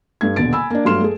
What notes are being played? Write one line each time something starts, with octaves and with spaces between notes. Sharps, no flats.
G2 A3 G#6
D#1 B2 D3 A6 D7
G#5 B5 E6
A#3 D4
G2 F#3 A3 C6 F6 E7
A3 G#4